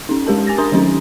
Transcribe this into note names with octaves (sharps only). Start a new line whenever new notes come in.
C#4 D#4
G#3 G4 A#4 A5
G#5 A6 A#6
D4 A#4 A#5 C6 D#6
D#3 F#3 C#4 D#4